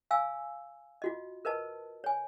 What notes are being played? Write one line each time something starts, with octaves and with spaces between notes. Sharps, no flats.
F5 G#5 E6
F4 F#4 D#5
A#4 B4 D#5 A5
C#5 G#5